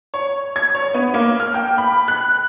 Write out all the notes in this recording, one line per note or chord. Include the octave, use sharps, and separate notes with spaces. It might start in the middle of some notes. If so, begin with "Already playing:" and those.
C#5
G#6
C#5
B3
A#3
F6
G5
B5
F#6